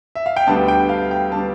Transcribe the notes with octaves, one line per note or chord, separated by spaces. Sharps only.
E5
F5
G5
D2 D3 G3 B3 A5
G5
F5
G5
D3 G3 B3 A5